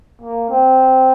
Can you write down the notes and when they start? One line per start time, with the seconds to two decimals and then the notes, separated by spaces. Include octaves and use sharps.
0.21 A#3
0.50 C4